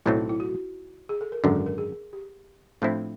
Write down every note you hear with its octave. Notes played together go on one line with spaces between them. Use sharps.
B1 A2 F#3 A3 C4 E4
D#4
E4
F#4
G#4
A4
A#4
G#1 F#2 D3 A4
A#4
A#4
G#4
G4
A2 F3 A3 C4 D4 E4